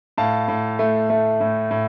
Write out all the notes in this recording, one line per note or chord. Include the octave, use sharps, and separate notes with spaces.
A2 F5 A5
A2
A3
A3
A2
A2